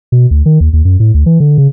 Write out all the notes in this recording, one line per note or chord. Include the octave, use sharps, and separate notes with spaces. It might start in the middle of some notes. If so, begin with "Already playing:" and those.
B2
D2
D#3
D#2
D#2
F#2
A2
D2
E3
D3
C#3